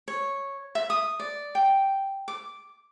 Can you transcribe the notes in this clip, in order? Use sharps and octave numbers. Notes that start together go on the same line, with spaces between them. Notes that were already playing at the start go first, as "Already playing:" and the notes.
C#5
E5
D#6
D5
G5
D6